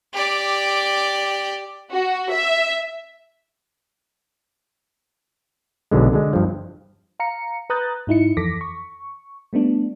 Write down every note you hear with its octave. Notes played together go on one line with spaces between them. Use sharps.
G4 D5
F#4
E5
B1 B2 D3 G#3
D3 G#3
G2 F3
F5 A#5 C#7
B4 A#5 D#6 F#6 G6 A6
G#2 D#4 E4 C#7
F2 E3 A4 D6 A#6 B6
C#6
G3 A3 B3 D4